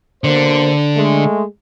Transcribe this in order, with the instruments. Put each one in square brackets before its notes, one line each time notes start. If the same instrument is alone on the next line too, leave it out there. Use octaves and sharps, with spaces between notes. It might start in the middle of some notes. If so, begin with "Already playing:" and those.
[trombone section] B2 A#3 C5 [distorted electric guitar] D3
[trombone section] G#3 A3